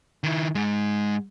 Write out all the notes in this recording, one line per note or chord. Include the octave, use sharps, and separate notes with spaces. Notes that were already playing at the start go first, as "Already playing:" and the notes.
D#3 E4
G#2 G#3